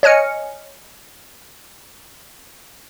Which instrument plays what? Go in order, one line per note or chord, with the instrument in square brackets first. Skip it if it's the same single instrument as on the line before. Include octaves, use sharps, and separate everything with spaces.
[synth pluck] C#5 D#5 G#5 F6 C#7